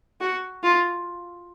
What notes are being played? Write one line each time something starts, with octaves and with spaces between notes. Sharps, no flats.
F#4
F4